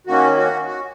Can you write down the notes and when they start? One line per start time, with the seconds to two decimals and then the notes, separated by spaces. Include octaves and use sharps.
0.07 D#3 A#3 C#4 F#4
0.37 F#4
0.67 F#4